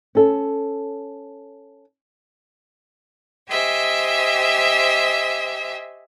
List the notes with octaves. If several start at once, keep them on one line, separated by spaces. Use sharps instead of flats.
C#4 A4
G4 C5 D#5 E5 G#5